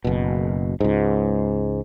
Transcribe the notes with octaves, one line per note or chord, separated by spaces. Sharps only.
F#1 B2
C#2 G#2